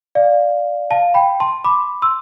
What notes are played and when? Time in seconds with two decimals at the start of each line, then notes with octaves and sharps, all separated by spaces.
0.15 D5 F5
0.91 F5 A5
1.14 G5 B5
1.40 A5 C6
1.64 B5 D6
2.02 C6 E6